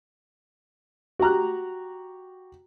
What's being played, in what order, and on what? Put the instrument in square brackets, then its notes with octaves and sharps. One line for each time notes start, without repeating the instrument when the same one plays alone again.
[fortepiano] F#4 G4 A#5 F#6